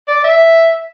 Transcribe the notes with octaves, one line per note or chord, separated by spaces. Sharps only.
D5
E5